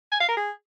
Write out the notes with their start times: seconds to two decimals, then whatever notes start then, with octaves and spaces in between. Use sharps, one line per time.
0.12 G#5
0.20 F5
0.28 A#4
0.37 G#4